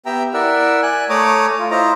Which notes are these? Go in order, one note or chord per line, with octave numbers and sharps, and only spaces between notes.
B3 G4 E5 G5 A#5 E6
E4 A#4 D5 E5 F#5 E6
D5 G#5 F#6
A3 C#5 A#5 D6 D#6
F4
E4 F4 C5 D#5 A#5